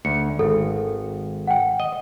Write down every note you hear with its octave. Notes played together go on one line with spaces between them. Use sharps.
D2 C#7
G#1 A4
F#5 G5
D#5